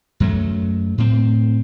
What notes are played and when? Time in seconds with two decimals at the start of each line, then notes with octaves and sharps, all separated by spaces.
0.20 F#2 F#3 A3
0.98 A2 C4